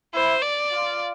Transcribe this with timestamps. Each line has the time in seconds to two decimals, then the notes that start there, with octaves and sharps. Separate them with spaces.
0.14 E4 C5
0.42 D5
0.71 F4